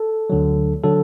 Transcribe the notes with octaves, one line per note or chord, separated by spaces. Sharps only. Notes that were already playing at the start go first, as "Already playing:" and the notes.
Already playing: A4
D2 D3 F#3
D3 F#3 A4